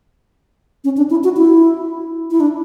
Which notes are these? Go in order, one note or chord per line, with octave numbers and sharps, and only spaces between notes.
C#4
D4
E4
F#4
E4
E4
D4